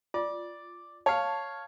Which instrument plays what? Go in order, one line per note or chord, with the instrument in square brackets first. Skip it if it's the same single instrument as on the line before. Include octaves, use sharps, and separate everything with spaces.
[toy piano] F4 [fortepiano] D5
[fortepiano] C#5 F5 [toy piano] A5